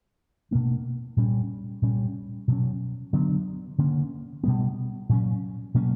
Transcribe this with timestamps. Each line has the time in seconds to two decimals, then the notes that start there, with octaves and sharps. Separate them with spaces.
0.51 B2 A#3 D4
1.17 A#2 G3 C#4
1.82 A#2 G3 C#4
2.48 B2 F#3 C#4
3.13 D3 F#3 B3 D4
3.78 D3 A#3 C#4
4.43 B2 G3 B3
5.09 A#2 F#3 C#4
5.74 B2 F#3 A#3 C#4